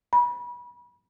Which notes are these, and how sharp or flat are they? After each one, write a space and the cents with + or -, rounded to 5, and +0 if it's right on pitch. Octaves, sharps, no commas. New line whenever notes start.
B5 -30